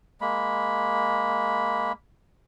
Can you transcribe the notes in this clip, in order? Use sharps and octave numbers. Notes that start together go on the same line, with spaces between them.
G#3 A#3 B5